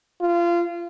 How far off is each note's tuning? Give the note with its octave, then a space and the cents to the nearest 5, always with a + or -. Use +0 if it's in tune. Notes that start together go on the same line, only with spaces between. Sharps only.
F4 -25